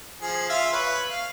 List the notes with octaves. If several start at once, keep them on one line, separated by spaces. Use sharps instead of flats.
F3 G#4
F4 E5 F5
B4 C#5
F5